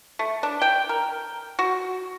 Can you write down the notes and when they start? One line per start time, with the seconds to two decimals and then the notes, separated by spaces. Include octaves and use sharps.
0.19 A3
0.43 D4
0.62 G5
0.89 A#4
1.59 F#4